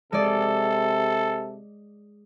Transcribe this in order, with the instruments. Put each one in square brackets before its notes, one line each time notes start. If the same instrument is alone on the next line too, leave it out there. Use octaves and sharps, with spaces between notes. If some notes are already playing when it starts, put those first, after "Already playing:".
[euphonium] C3 [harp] G#3 D5 [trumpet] A4